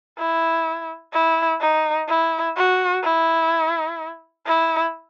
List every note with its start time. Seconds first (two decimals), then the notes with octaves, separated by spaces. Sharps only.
0.18 E4
1.13 E4
1.60 D#4
2.08 E4
2.56 F#4
3.04 E4
4.46 E4